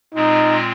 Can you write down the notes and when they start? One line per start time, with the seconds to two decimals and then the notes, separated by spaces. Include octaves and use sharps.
0.14 A#2 G#3 C4 D#4 F4